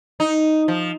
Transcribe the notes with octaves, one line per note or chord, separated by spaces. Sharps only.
D#4
F3